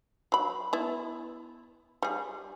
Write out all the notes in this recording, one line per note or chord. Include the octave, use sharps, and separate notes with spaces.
F#3 B5
B3 E4
G3 G#4